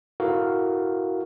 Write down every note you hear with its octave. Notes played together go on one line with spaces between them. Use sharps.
E4 F#4 A4 A#4 F5